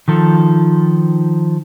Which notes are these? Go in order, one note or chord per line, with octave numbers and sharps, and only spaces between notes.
D#3 F3 A4